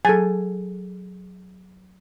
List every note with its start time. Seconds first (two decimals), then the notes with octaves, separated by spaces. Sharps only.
0.05 F#3 G#4 A4 G#5 A6